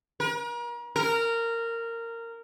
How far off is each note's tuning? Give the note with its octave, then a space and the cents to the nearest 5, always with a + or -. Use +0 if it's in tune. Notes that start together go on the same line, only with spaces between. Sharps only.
A#4 +40
A#4 -15